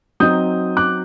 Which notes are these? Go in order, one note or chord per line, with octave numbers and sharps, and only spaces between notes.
F#3 C4 D#4 D#6 G6
D6 F#6